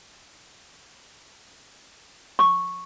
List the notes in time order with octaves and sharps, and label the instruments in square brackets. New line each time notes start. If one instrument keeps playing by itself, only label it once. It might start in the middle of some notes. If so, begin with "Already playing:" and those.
[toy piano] C#6